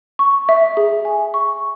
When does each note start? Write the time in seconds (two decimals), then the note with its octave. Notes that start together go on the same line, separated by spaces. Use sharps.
0.19 C#6
0.49 E5
0.77 G#4
1.05 G#5
1.34 C#6